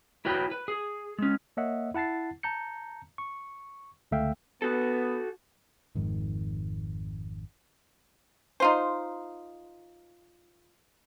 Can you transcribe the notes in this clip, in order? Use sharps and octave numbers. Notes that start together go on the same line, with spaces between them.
E4 F#4 B4 C#5 G5
B4
G#4
G#3 C#4
A#3 C#5 D#5 E5 F#5
E4 F#5 A5 A6 C7
A5 A#5 G6 C#7
C#6
C#2 D3 A3 E5 F5 G5
B3 F#4 A4
G#1 F2 G#2 D#3
D#4 F4 C5